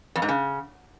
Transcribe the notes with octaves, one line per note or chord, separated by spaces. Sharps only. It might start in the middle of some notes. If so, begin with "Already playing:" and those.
F2
G#2
C#3